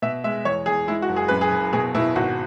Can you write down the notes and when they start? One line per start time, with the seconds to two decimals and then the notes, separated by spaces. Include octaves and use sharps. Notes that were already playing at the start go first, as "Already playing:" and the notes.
0.02 B2 E5
0.24 G#3 E5
0.45 E2 C#5
0.66 E2 G#4
0.87 G#3 E4
1.02 F#4
1.09 F#1
1.16 G#4
1.28 F#2 B4
1.41 G#4
1.51 F#1
1.73 B2 G#4
1.95 B2 E4
2.16 G#1 F#4